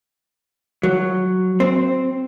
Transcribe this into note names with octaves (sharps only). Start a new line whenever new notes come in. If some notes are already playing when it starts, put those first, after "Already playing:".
F#3
C4